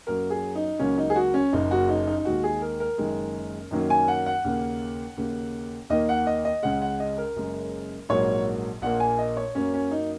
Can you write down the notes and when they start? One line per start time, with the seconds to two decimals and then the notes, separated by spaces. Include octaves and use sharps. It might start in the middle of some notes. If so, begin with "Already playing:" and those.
0.07 F#2 F#3 A#3 A#4
0.30 G#4
0.55 D#4
0.79 C#2 C#3 F#3 A#3 C#4
0.98 D#4
1.10 G#4
1.15 F#4
1.34 C#4
1.53 F#1 F#2 C#3 A#3 D#4
1.71 F#4
1.89 D#4
2.07 D#4
2.18 D#4
2.25 D#2 D#3 G#3 F#4
2.44 G#4
2.62 A#4
2.80 A#4
2.98 F#1 F#2 D#3 G#3
3.71 F#2 D#3 F#3 A#3
3.90 G#5
4.08 F#5
4.26 F#5
4.45 D#2 C#3 A#3
5.17 D#2 C#3 A#3
5.90 D#2 D#3 A#3 D#5
6.09 F#5
6.27 D#5
6.45 D#5
6.63 C#2 C#3 G#3 F#5
6.82 F#5
7.00 D#5
7.18 A#4
7.36 F#1 F#2 C#3 G#3
8.09 A#1 G#2 F#3 A#3 C#5
8.82 A#1 A#2 A#3 F#5
9.00 G#5
9.19 D#5
9.37 C#5
9.55 F#2 F#3 A#3 C#4
9.74 C#4
9.91 D#4